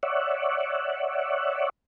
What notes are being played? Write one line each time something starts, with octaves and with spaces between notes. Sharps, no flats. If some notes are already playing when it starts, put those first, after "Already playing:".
C#5 D5 E5 F#5